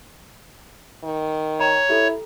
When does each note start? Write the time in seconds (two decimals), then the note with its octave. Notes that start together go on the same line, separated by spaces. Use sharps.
1.04 D#3
1.59 C#5 G5 A#5
1.89 E4 G4 A4